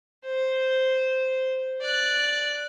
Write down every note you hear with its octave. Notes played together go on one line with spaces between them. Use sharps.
C5
D5 F#6